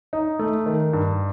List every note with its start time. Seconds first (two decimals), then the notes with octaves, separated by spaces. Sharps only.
0.13 D#4
0.39 A3
0.66 D#3
0.93 G2